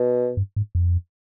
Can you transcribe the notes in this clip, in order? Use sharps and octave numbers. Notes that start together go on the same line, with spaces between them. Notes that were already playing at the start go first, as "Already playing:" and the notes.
Already playing: B2
G2
G#2
F2